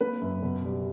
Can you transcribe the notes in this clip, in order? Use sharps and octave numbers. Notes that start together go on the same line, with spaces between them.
A#3 B4
F#2
B2
G3